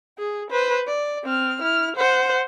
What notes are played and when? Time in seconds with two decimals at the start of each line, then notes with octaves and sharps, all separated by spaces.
0.19 G#4
0.50 B4 C5
0.87 D5
1.24 C4 F6
1.62 E4 F6
1.96 C5 F#5